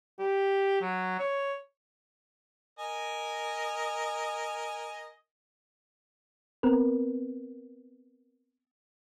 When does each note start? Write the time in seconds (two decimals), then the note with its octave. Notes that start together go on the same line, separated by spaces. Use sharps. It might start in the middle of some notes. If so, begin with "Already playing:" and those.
0.19 G4
0.81 F#3
1.19 C#5
2.79 A#4 D#5 G#5
6.63 B3 C4 A#4 B4